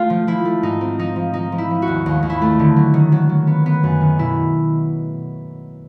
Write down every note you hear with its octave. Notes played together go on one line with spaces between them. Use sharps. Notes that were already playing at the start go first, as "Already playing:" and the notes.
Already playing: A3 F4
F3
F3 E4
A3
G#2 D#4
C4
F3 D#4
F3
F3 D#4
F3
E4
F3
F#4
D#2
D#2
D#2
E4
A3
D3
F#3
D#3
F#3
F#3
B3
B3
F#2
D#3
B2 E4